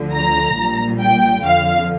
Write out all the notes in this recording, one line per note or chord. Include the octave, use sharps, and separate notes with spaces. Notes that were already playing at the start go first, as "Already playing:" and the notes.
Already playing: D2 D3 F3
A#5
A#1 A#2 G3
G5
F2 D3 F3 F5